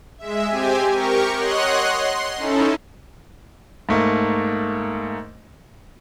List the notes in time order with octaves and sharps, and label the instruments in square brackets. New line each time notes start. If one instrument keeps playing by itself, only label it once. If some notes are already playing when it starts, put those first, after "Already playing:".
[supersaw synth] G#3 E5
C4 G4 G#5
G4 A#4 C#6
C#5 D#5 F#5 C6 F#6
C6
C#4 D#4 E4 A4
[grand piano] G#2 A3 A#3